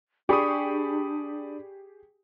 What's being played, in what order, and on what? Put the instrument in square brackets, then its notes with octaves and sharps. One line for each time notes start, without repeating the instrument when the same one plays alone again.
[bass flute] D4 [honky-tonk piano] G4 G#4 C#6 [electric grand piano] D5 B5 D#6